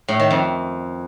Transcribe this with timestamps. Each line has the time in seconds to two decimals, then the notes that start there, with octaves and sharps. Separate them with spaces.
0.08 A2
0.19 D#3
0.31 F2